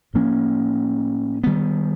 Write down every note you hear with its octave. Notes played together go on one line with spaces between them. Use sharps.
A2 F3 A#3 C#4
D#3 G3 B3